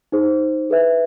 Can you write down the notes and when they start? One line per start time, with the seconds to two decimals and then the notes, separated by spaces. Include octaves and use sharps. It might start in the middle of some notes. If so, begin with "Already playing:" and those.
0.12 D#4 G#4 C5
0.70 G#4 B4 E5